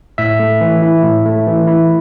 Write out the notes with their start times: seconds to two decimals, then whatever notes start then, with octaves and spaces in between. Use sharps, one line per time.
0.18 A2 E5
0.40 A3
0.61 E3
0.82 E4
1.03 A2
1.25 A3
1.47 E3
1.67 E4